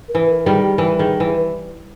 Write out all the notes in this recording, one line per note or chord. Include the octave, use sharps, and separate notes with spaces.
A#4
E3 B4
A#4
D#3 G3 G#4
G4
E3 A#4
D#3 G#4
E3
B4